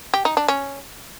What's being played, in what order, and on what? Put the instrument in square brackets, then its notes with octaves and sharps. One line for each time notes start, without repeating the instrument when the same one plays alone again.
[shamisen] G4
D#4
D4
C#4